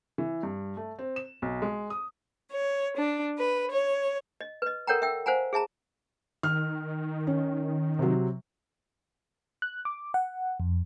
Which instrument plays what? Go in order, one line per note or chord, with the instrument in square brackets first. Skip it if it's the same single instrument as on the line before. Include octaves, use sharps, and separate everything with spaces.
[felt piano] E3
G2
A3
C4
E7
B1
G#3
D#6
[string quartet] C#5
D4
B4
C#5
[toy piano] D#5
B4 D#5
A4 A#4 C#5 F#5 G5 A#5
E5 G5 E6
C5 F5 F#5 G#5 A#5
G#4 E5 A5 A#5
[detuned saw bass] D#3 [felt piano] F6
[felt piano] C#4
C3 F#3
[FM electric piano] F#6
D6
F#5
F2